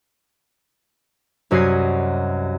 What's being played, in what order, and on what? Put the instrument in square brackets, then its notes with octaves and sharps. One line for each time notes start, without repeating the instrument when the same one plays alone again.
[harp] C2 F#2 F#4 D#5 G#6 C7